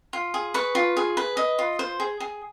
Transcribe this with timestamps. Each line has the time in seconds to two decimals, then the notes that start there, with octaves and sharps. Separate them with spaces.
0.13 F4
0.34 G#4
0.54 B4 C#6
0.75 F4
0.97 G#4
1.17 B4
1.37 D#5
1.59 F4
1.79 C5
2.00 G#4
2.20 G#4